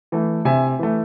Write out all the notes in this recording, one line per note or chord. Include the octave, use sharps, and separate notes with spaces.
E3 A3
C3 E5 G#5
E3 A3